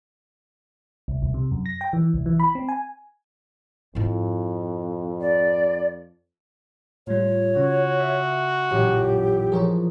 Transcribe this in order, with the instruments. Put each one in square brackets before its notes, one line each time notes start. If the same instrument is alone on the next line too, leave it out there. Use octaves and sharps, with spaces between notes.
[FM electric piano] C2
C2
C3
F#2
A#6
G5
E3
C2
E3
B5
C4
G#5
[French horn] F2 [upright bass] G#2 E4
[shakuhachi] D5
[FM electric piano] A2 G3 [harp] F4 [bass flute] C#5
[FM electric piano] C#3 [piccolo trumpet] F#4
[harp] E5
[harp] A1 F#2 A#2 [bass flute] G4
[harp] F3 G#3 [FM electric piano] G#4 A#4 C#5